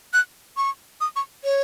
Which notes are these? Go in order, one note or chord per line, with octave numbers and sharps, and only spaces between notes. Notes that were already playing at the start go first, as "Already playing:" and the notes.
F#6
C#6
D#6
C#6
C#5